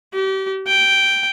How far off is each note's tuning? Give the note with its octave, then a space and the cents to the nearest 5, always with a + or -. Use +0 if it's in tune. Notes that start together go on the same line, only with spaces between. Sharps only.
G4 -35
G5 -5